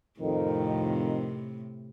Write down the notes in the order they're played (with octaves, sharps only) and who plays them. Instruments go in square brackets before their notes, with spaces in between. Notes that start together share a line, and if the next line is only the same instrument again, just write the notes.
[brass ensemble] F2 D#3 [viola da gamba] A2 C3